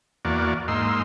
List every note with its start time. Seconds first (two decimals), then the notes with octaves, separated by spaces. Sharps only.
0.25 E2 A#3 F#4 D5
0.68 G#2 A#3 D#4 C6 E6